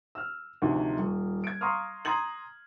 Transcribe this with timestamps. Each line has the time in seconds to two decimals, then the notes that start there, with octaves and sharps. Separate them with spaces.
0.15 E6 F6
0.62 D2 C3 D#3 F3
0.98 D#1
1.44 G#6 D7
1.61 F5 A#5 C6 C#6 D#6 F6
2.05 A#5 C6 D#6 G#6 F#7